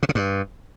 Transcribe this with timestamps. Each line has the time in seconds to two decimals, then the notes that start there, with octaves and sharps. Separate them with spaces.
0.03 C3
0.09 C#3
0.15 G2